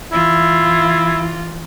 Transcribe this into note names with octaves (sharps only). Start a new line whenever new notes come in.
E3 E4 F4